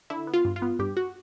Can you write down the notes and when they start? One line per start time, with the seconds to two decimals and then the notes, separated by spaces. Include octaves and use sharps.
0.10 D3 E4
0.27 B3
0.34 F4
0.45 G2
0.56 F4
0.62 B3
0.79 G2 G4
0.97 F#4